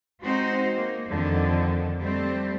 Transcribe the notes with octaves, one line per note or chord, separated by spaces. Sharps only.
G#3 C4 D#4 F#4 C5
A#3
F2 D3 D#3
G3 A3 C4